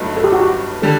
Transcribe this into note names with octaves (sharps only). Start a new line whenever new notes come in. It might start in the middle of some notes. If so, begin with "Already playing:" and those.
Already playing: G1 G2 F#3 A3 D#4
A4
G4
F#4
G4
D3 G3 A4